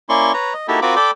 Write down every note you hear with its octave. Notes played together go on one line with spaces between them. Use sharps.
A#3 C#4 E4 D5 C6 C#6
B4 C#5 A#5
D#5
A#3 D#4 E4 F#4 G4 A4
C4 F4 F#4 A#4 B5 D6
A4 D5 G5 B5 D6